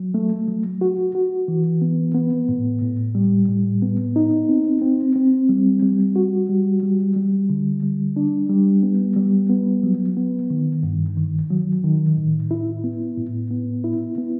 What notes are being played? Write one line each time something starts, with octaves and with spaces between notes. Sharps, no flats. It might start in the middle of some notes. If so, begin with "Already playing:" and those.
Already playing: F#3
A3
F#3
F#4
F#4
E3
B3
B3
A2
A2
G3
A2
B3
D#4
C4
C4
C4
G3
G3
F#4
G3
G3
G3
D3
G3
D4
G3
B3
G3
B3
F#3
B3
D#3
G2
D#3
F#3
D#3
A2
E4
B3
A2
B3
E4
B3